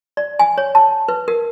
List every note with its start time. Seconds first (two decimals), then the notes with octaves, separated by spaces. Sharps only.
0.17 D5
0.39 G#5
0.58 C#5
0.75 A5
1.09 B4
1.28 A#4